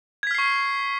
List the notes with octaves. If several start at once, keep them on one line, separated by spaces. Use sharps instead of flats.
C#6 F6 G#6 B6 C7